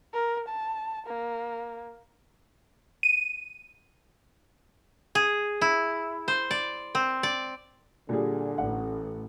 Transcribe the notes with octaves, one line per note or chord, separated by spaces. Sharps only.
A#4
A5
A#3
D#7
G#4
E4
C5
D5
C4
D5
A#2 D3 G3 G#4
A1 F#5